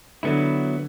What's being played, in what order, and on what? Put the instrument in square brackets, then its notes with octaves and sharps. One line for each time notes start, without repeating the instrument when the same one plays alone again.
[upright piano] D3 [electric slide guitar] F#3 B3 E4